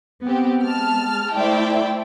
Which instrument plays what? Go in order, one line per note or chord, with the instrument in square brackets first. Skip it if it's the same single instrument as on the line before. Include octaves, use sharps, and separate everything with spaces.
[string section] B3 C4 G4
G#3 A5 F6
A3 E4 C5 D5 E5 G5